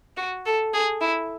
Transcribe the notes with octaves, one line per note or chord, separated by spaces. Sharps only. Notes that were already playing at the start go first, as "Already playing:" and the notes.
F#4
A4
G#4
E4